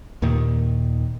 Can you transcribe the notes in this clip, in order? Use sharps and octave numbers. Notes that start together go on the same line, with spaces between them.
D#2 A#2 D#3 A#3